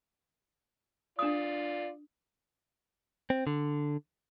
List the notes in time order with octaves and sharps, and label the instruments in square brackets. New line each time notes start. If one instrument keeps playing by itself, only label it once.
[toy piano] D4 D#6 [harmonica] F4 D5
[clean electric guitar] C4
D3